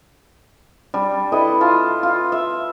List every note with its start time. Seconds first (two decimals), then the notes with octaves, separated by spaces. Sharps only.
0.94 G3 D4
1.32 E4 A4 B4 D#5
1.61 F4 A5
2.03 F4
2.32 E5